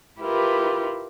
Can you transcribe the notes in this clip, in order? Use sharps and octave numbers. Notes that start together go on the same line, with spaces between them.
E4 F4 G4 A#4 B4